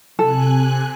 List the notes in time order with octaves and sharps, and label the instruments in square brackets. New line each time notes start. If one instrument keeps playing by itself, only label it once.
[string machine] C3 G#5 F#6 [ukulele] A4